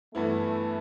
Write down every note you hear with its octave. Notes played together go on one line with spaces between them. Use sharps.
G2 E3 A3 B3 E4